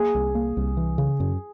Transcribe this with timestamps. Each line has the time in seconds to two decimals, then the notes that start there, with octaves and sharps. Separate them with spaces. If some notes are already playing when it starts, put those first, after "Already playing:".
Already playing: A#3 G#4
0.15 C2
0.35 A#3
0.57 C2
0.77 E3
0.98 C#3
1.20 F#2